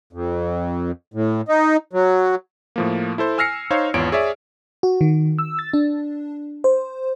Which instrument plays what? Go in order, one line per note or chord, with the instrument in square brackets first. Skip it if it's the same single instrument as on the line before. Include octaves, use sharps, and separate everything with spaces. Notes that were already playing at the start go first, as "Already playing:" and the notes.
[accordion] F2
A2
D#4
F#3
[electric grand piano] A2 F3 A#3
E4 A4 C5
G#5 E6 F6 A#6 C7 C#7
D#4 C5 C#5 F5
G#1 E2 F4 C#5 D7
G#4 C#5 D5 E5
[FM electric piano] F#4
D#3
E6
A6
D4
C5